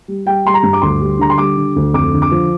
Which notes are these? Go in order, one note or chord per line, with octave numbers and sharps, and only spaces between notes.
G3
G3 G5
G3 C6
A#5
G2
D6
D2 C6
G3
D3 A#5
C6
G3 D6
D3
D2
F2 D6
D3
D6
F3